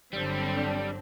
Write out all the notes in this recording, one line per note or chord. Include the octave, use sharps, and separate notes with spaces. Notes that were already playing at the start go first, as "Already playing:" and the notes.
G1 D3 F#3 G3 C4 D4